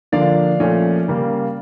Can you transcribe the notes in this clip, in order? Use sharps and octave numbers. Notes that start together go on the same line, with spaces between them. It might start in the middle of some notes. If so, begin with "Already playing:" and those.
D3 F3 A#3 D4 D5 F5
A#2 F3 A3 C#4
C#3 G3 A#3